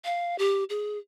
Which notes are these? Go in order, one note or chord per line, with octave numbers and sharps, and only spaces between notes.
F5
G4
G#4